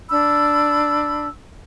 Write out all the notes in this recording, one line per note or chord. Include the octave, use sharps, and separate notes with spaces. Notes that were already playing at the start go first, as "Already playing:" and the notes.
D4 B5 E6